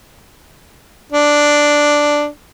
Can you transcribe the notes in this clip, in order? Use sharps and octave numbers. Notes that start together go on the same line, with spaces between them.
D4